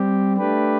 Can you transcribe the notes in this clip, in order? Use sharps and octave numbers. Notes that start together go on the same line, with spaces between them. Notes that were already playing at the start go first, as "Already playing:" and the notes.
Already playing: G3 C4 G4
A3 D4 G4 B4